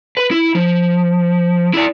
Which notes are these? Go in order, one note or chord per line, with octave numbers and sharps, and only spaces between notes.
B4
E4
F3
E4 D5